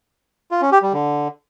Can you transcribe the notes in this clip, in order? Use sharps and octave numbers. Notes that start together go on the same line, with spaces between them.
F4
C#4
G4
G3
D3